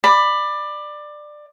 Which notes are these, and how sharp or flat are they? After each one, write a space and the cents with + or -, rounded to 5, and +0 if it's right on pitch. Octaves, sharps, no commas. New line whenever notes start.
D5 +20 B5 +0